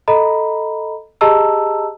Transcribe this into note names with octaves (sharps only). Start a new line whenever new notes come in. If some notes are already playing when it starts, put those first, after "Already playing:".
A4 D#5 A#5 B5
G4 G#4 D#5 A5 A#5 E6